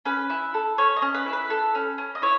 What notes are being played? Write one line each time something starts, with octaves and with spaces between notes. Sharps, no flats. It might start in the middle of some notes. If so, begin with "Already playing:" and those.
C#4 B4
E4
A4
C#4 C#5
D#5
C#4
B4
E4
B4
A4
C#4
C#4
D#5
E4 C#5